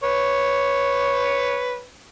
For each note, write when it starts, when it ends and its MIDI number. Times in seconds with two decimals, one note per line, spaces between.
0.03 1.83 71
0.03 1.83 73